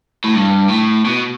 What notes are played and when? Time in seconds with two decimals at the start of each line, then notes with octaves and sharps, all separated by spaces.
0.24 A2
0.34 G2
0.69 A2
1.05 B2